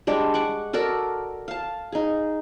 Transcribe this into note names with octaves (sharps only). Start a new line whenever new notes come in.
G3 G#3 D4 G5
F#5 C#6 D6
F#4 A4 A#4 D5
F5 A5
D#4 G#4